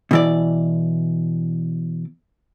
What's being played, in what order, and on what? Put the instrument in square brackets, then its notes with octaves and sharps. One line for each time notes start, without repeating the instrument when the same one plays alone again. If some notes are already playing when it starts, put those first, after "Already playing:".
[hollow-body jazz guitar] B2 E3 D5